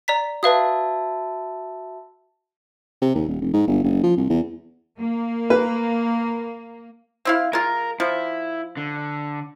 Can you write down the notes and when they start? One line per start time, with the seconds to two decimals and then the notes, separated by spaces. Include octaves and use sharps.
0.08 D5 A#5 B6
0.43 F#4 B4 E5 F5 A5 D#6
3.02 C3
3.15 D#2
3.28 D#1
3.41 F1
3.53 G#2
3.67 G1
3.84 F#1
4.03 F3
4.17 C2
4.30 E2
5.00 A#3
5.50 B4
7.25 C4 E4 F5
7.53 G#3 F4 A#4
8.00 F3 E4
8.77 D3